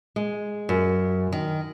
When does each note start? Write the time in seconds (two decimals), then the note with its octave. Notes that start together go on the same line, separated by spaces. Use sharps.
0.16 G#3
0.69 F#2
1.32 D#3